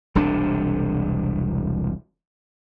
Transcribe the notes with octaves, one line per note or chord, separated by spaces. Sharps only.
E1 C2 C3 D4